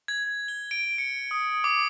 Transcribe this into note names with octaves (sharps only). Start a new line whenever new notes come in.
G#6
G7
D7
C#7
D#6
D6